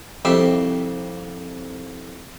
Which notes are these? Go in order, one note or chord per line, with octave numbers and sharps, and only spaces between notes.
C2 F2 G4 E5 F5